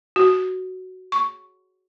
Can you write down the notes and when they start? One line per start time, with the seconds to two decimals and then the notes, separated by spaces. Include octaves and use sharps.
0.16 F#4
1.12 C#6